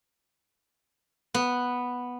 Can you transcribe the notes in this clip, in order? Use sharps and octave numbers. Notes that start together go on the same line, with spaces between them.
B3